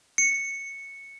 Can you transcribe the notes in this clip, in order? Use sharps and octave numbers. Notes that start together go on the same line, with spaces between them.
C#7